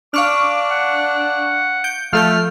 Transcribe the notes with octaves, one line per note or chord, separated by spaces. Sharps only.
D4 F5 C#6 D6 F6
F#5
G6 D7
F3 A3 A4 F6 G6